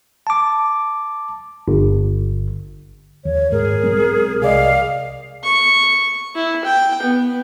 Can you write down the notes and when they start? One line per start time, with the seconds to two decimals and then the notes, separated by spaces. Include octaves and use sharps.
0.27 A5 D6
1.68 G1
3.25 D#2 C#5
3.52 G#2 G#4 A#4
3.83 B1 G#3 C4
4.42 C2 G#4 D5 D#5 F5
5.44 C#6
6.35 E4
6.65 G5
7.03 B3